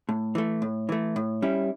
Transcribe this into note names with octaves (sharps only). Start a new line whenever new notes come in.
A2
E3 A3
A2
E3 A3
A2
G3 C#4 E4